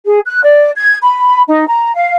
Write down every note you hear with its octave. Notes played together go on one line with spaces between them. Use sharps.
G#4
F#6
D5
G#6
B5
D#4
A#5
F5